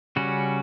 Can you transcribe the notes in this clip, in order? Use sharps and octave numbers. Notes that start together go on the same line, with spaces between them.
C#3 G3 C#4 F#4